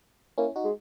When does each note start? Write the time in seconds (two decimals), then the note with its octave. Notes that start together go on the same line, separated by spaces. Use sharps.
0.38 A#3 C#4 E4
0.56 D#4 F#4
0.64 G#3